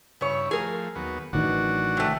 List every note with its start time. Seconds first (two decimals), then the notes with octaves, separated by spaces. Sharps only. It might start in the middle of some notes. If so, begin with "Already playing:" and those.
0.21 G2 C#3 E4 C#5
0.51 F3 A3 G#4 A#4
0.95 D#2 F#3 B3
1.33 A1 D#3 E3 F#3 D4 F#4
1.97 C3 A3